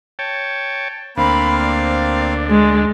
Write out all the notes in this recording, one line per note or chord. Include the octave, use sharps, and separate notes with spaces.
C#5 G5 A5
D2 A#3 C4 D4 F5 B5
D5
G#3